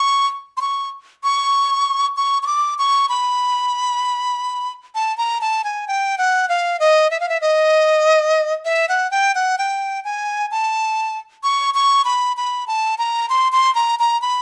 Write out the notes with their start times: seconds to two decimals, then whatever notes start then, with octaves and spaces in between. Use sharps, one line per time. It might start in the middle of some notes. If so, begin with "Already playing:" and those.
Already playing: C#6
0.57 C6
0.61 C#6
1.24 C#6
2.17 C#6
2.43 C#6
2.47 D6
2.79 C#6
3.09 B5
4.95 A5
5.18 A#5
5.41 A5
5.64 G#5
5.88 G5
6.18 F#5
6.49 F5
6.80 D#5
7.11 E5
7.20 F5
7.29 E5
7.41 D#5
8.65 E5
8.89 F#5
9.11 G5
9.35 F#5
9.58 G5
10.05 G#5
10.51 A5
11.43 C#6
11.74 C#6
12.05 B5
12.37 B5
12.67 A5
12.98 A#5
13.29 C6
13.52 C6
13.75 A#5
13.99 A#5
14.22 B5